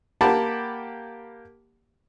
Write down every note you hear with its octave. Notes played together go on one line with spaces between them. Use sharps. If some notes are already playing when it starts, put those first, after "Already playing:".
A#3 G4 F#5 A5 B5